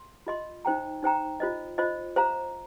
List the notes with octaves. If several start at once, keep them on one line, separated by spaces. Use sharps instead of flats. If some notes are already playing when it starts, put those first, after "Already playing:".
Already playing: C6
F4 D#5 C6
D#4 C5 G5 A#5
D#4 C5 G5 A#5
F4 C5 D#5
F4 C5 D#5
C5 F5 A#5